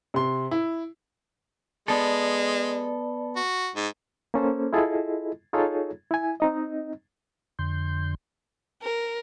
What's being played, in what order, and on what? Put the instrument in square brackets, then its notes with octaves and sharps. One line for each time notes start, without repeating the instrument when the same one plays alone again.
[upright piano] C3 C6
E4
[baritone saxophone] G#3 [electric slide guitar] B3 A4 [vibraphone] D5
[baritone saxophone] F#4
G#2
[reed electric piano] A#3 C#4 A4 C5
E4 F4 G#4 A4 D#5
D#4 F4 G#4 A4 C#5
E4 G#5
C4 D#4 D#5
[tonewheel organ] F2 D3 C6 G6
[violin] A#4